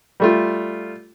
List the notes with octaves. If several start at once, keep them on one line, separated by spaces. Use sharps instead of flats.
G3 A3 F4